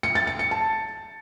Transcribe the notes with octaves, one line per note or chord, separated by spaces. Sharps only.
C#7
A6
C#7
C#7
A5